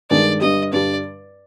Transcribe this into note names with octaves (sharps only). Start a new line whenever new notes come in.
G2 D#3 G#3 D5
G2 D3 G3 D#5
G2 D3 G3 D5